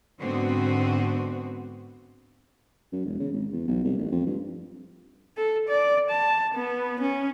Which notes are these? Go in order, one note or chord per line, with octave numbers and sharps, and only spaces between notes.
G#2 D3 B3 C4 F#4
F#2
E1
C#3
G#1
E2
B1
C2
A1
F2
G2
A4
D5
A5
B3
C#4